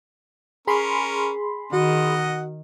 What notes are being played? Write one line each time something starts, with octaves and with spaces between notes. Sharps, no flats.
C#4 G#4 A#4 B5 C6
D#3 F#4 D#5 F#5